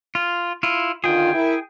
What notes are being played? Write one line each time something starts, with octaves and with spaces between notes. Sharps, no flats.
F4
E4 F4
D3 D#3 F4 G#4 G5
E4 A#4